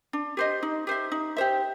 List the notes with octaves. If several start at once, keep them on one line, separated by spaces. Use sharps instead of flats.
D4
G4 C5 D#5
D#4
G4 C5 E5
D#4
G4 C5 E5